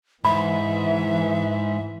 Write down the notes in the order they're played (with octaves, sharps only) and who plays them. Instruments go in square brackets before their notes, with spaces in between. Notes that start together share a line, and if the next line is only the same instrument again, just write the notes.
[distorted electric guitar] G#2 [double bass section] E3 [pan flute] E5 [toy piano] B5